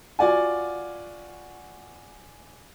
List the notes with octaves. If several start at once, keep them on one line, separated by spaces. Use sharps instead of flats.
F4 F#4 D5 F#5 G#5